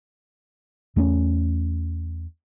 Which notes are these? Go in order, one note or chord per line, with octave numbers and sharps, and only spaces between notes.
E2 A3 A#3 C#4